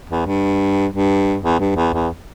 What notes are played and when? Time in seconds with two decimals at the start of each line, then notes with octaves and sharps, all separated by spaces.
0.10 E2
0.26 G2
0.92 G2
1.44 E2
1.60 G2
1.76 E2
1.93 E2